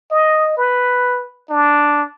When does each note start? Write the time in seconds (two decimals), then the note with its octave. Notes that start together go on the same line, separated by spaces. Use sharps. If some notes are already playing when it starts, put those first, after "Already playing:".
0.12 D#5
0.57 B4
1.50 D4